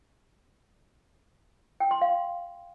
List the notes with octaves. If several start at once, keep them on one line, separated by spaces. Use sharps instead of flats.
G5
C6
F5